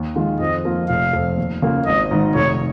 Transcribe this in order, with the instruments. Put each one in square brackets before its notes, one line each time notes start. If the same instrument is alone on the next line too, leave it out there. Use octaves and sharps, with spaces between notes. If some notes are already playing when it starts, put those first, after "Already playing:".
Already playing: [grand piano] D#2
D#3 G#3 F4
[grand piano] F2 [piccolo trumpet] D#5
[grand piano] F3 A#3 F4
[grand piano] F1 [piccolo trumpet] F5
[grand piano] F2 F3
D#2
C#3 A#3 F4
[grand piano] G#1 [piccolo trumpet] D#5
[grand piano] G#2 D#3
[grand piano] F1 [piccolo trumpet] C#5